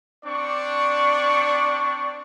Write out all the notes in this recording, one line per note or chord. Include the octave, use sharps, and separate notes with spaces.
C4 D4 D5 C#6